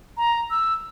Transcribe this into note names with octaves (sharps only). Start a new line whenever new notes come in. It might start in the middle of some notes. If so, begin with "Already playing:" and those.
A#5
E6